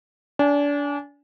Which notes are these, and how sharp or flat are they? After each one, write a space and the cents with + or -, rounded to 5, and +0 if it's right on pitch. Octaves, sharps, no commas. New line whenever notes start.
D4 -30 G#5 -5